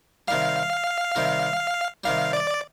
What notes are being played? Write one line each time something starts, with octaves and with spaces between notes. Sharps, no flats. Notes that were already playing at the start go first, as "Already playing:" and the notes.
C3 D#3 G3 F5
C3 D#3 G3
C3 D#3 G3 F5
D5